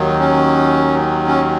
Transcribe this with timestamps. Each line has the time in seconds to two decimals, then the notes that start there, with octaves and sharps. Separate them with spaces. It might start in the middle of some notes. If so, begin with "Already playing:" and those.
Already playing: D#2 D#3 F#3
0.20 C#4
1.27 C#4